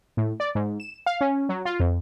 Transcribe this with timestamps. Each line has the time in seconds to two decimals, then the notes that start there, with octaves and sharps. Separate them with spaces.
0.17 A2
0.40 D5
0.55 G#2
0.80 E7
1.06 F5
1.21 C#4
1.49 F#3
1.65 F4
1.80 F2